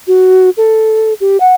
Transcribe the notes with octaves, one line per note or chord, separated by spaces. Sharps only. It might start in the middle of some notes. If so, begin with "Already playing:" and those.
F#4
A4
G4
F#5